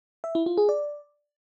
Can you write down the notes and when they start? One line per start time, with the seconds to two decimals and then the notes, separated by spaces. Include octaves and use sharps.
0.24 E5
0.35 E4
0.46 F4
0.57 G#4
0.69 D5